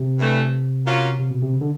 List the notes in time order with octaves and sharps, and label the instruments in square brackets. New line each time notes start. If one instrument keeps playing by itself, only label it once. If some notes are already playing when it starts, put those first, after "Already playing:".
Already playing: [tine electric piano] C3
[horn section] G2 E3 A3
F#3 A#3 C#4 F4
[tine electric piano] C3
B2
C3
C#3
D3